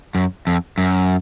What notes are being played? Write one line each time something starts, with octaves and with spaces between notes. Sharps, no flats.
F#2
F2
F#2